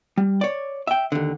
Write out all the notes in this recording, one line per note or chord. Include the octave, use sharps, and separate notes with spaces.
G3
C#5 D5
E5 G5
D#2 D3